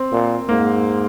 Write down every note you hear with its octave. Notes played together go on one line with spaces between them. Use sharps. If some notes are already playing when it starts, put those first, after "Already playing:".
Already playing: C4
A#2
G#2 A#3